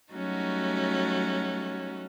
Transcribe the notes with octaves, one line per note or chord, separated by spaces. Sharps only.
F#3 G3 A3 C#4 D#4 F#4